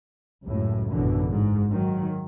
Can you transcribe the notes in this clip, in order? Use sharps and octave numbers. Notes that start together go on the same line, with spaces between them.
C#2 F#2 A2
A1 F#2 B2 D3 E3
G#2
D#3 F#3